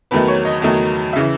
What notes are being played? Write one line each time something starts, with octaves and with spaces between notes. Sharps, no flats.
E2 D#3 F#3 A3 B4
C#5
D#5
E2 D#3 F#3 A3
C#3 E3 E5